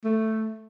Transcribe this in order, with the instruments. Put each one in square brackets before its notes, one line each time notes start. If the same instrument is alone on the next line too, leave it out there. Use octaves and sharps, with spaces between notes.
[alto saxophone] A3